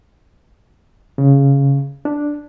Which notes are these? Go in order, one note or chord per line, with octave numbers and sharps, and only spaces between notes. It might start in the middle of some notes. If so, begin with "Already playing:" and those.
C#3
D4